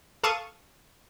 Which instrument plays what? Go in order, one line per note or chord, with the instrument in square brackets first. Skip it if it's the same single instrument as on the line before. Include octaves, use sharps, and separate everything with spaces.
[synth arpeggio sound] A4 F5 A5 C#6 D#6